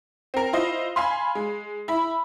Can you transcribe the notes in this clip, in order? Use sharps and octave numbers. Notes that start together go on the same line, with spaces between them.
C4 A#4
E4 F4 C5 D#5
F5 G#5 B5 C6
G#3
E4 B5